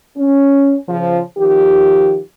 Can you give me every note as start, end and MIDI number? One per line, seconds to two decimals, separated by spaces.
0.17 0.74 61
0.88 1.20 49
0.88 1.20 53
1.38 2.19 51
1.38 2.19 53
1.38 2.19 67